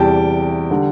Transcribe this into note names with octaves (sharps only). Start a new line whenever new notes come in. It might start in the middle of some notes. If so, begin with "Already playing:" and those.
Already playing: E2 C3 E3 G3 G5 A5
D3 G3